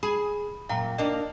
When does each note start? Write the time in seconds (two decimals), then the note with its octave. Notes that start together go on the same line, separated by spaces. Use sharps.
0.03 G#4 B5
0.69 F#2 A#2 F5 G5 A#5
0.98 A#3 D4 D#4 D#5